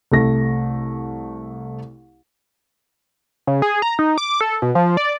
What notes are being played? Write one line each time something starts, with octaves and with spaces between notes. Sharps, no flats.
C2 A3 A#6
C#3
G#4
A#5
D#4
D6
A4
B2
F3
D5